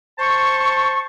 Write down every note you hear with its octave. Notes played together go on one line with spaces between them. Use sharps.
C5 A5 C#6